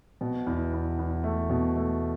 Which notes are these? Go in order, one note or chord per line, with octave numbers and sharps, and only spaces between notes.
B2
E2
E2
E2
A3
B2
A3